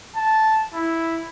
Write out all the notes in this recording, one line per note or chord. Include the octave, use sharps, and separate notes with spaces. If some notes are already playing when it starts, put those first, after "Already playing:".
A5
E4